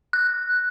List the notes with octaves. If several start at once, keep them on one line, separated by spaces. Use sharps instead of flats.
F#6